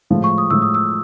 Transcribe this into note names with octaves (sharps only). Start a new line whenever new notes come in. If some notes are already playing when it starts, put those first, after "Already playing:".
A2 F3 G#3
C#6
D#6
A2 F3 G#3 E6
D#6
E6